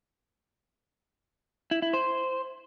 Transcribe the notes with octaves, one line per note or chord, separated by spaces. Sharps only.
E4
E4
C5